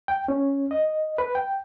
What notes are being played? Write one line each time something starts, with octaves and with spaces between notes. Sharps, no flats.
G5
C#4
D#5
B4
G5